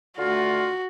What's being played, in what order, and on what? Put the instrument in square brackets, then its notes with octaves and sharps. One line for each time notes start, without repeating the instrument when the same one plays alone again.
[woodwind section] D3 A3 F4 [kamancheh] F#4